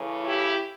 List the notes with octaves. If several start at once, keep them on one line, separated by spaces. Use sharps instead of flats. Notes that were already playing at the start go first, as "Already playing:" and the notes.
Already playing: C#3 E3 A3 C#4
E4 G4